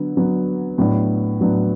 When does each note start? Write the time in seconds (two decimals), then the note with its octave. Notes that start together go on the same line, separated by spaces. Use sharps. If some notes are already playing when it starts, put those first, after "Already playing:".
Already playing: D3 F#3 B3
0.17 D3 F#3 B3
0.78 A2 F#3 B3 D4
1.41 A2 F#3 B3 D4